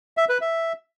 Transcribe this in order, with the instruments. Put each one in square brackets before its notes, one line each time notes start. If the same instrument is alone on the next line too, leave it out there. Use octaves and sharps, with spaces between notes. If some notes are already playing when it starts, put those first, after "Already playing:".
[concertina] E5
B4
E5